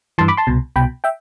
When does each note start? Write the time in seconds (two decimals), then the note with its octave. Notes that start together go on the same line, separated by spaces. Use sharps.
0.18 G2 E3 A5 C6
0.28 B5 D6
0.37 A5 C6
0.47 C2 B2
0.76 C2 B2 G5 B5
1.04 E5 G5